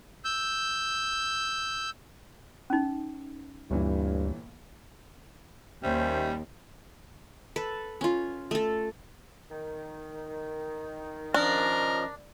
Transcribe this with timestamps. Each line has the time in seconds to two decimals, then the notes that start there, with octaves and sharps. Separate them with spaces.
0.25 E6 G6
2.70 C#4 D#4
3.71 G1 D2 G2 A#2 E3
5.83 D#2 G3 C#4 C5 E5
7.56 A4 B4
8.01 C#4 F4
8.51 A3 A4
9.50 D#3
11.34 F3 C#4 D4 A#4 D#5